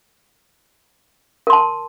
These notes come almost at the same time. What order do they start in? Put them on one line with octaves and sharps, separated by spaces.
A#4 C6 A5